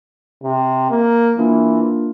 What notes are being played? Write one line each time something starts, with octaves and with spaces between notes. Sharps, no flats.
C3
A#3
E3 A#3 D4 F4 A#4